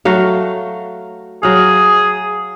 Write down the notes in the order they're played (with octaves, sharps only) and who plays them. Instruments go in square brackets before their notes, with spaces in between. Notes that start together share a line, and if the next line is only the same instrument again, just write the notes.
[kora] F#3 A3 F5
[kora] F#3 F5 [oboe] G#4